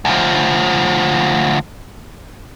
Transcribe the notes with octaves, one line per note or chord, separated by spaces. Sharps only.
D2 F3